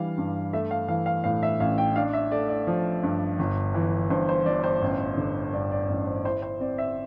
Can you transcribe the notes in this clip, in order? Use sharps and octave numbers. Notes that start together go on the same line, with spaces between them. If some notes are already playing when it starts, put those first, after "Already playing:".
Already playing: E3 G3 D4 F5
G2
A3 E5
F5
E3 F5
F5
A2 F5
E5
A1 F5
G5
D4 F5
E5
A3 D5
D5
F3
G2
G1
E3
G2 C5
C5
G1 D5
C5
A1
D3
G2 D5
D5
A1
C5
E4 C5
C5
C4 D5
E5